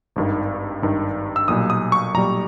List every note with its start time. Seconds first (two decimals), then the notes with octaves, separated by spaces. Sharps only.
0.16 G#1 G2 D#3
0.82 G#1 G2 D#3
1.36 E6
1.48 B1 A#2 G3 D#6
1.70 D#6
1.92 C#6
2.14 B1 A#2 G3 A#5